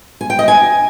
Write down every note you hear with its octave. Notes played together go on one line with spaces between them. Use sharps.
G#5
G5
D#5
G#5